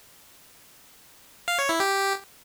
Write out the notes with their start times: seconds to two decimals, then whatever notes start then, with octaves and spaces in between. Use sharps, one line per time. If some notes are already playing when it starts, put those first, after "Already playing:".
1.48 F5
1.59 C#5
1.69 E4
1.80 G4